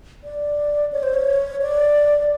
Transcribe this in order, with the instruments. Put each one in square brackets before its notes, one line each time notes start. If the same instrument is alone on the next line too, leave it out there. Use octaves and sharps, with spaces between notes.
[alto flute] D5
C#5
C5
C#5
D5